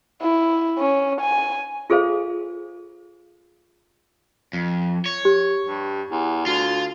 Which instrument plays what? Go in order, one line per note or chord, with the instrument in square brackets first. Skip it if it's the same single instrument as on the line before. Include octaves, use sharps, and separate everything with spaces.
[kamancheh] E4
C#4
G#5
[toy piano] F4 G#4 A4 C5 F5
[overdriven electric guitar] F2
C#5
[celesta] G4
[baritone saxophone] G2
E2
[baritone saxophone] D2 [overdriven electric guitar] F4